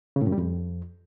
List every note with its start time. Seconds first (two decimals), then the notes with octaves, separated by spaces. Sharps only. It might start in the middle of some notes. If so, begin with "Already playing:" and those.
0.16 C#3
0.21 A2
0.27 F#2
0.32 G3
0.38 F2